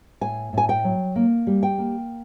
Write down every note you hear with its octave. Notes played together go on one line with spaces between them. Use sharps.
A2 G#5
A2 G#5
G5
F#3
A#3
G3
G5
A#3